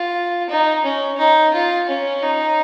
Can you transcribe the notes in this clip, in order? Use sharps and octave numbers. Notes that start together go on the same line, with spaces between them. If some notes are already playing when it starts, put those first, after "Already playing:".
Already playing: F4
D#4
C#4
D#4
F4
C#4
D#4